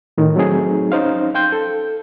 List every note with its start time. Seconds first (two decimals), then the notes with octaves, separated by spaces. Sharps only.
0.18 A2 D#3
0.36 F#3 A3 C4 D#4 G#4
0.92 C#4 D#4 C5 F5
1.34 F5 G5 C6 G6
1.52 A4